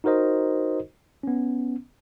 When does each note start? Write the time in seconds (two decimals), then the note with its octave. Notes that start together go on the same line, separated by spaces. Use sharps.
0.04 D#4 F#4 A#4 C5 D#5
1.23 B3 C#4